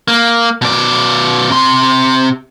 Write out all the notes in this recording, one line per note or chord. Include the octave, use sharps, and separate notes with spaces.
A#3
B2 D5
C3 C6